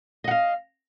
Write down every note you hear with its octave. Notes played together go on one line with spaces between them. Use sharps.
D#5 F5 F#5